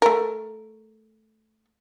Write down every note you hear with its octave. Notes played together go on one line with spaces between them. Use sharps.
A3 A#4